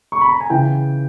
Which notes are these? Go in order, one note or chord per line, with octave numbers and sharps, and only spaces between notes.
C#6
B5
A#5
G#5
C#3 E3 G5